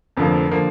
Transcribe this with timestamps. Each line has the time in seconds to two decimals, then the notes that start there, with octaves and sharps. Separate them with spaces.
0.17 F1 F2 D3 F3 A#3
0.51 D3 F3 A#3